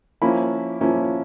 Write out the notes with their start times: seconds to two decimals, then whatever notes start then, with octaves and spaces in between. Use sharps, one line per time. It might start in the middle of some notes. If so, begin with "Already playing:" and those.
0.22 F3 A#3 C#4 E4 B5
0.80 F3 A#3 C#4 E4